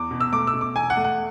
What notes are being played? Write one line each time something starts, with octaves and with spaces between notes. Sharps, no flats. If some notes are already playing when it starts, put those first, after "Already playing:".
Already playing: E2 D6
B2
E6
A3 D6
E6
B2
D6
E2 G#5
F#5
A3
F#5